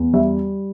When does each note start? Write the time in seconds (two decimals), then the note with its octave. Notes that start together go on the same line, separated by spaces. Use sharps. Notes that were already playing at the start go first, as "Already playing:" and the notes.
Already playing: E2
0.13 G3 E5